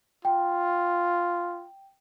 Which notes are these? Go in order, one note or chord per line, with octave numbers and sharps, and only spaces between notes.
F4 G5